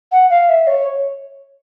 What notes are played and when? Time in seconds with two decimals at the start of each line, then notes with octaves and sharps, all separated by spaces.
0.12 F#5
0.30 F5
0.49 E5
0.67 C#5